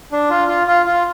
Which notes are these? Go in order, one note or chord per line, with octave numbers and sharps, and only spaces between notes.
D4
F4
F4
F4
F4